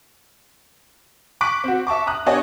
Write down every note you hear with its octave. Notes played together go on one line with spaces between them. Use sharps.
C#6 D6 F#6 B6 D7
C4 F#4
E5 A5 C#6 D6
A#5 D#6 F#6
B3 D4 G4 C#5 D#5 G#5